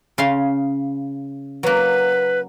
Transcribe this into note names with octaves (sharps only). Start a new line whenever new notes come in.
C#3 F5 C6
F#3 A#3 B4